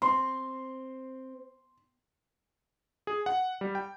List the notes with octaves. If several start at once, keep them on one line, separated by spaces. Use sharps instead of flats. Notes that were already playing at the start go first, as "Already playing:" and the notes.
C4 C6
G#4
F#5
G3
G5